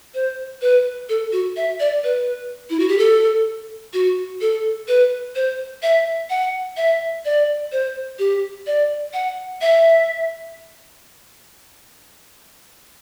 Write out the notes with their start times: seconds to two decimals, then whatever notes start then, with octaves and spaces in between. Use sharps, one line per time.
0.14 C5
0.62 B4
1.09 A4
1.32 F#4
1.56 E5
1.80 D5
2.04 B4
2.70 E4
2.79 F#4
2.88 G4
2.98 A4
3.93 F#4
4.41 A4
4.88 B4
5.35 C5
5.83 E5
6.30 F#5
6.77 E5
7.25 D5
7.72 C5
8.19 G4
8.67 D5
9.14 F#5
9.61 E5